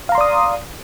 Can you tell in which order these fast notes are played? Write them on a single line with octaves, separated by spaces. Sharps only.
F5 A#5 C6 D5 D#6